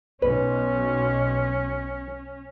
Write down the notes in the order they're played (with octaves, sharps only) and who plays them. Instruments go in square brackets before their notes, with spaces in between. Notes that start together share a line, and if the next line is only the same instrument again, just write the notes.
[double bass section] B1 [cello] C#4 [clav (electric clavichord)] B4